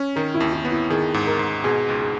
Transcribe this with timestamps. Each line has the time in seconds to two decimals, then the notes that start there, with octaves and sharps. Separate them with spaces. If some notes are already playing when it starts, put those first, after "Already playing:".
Already playing: C#4
0.16 D#3 A#4
0.34 E4
0.40 D#2
0.53 E4
0.65 B3
0.71 E4
0.90 D#3 G#4
1.14 G#2
1.27 A#4
1.39 G#2
1.64 B2 G#4
1.89 C#2
2.01 G#4